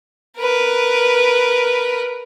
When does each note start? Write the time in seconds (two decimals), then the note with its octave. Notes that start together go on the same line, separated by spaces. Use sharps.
0.38 A#4 B4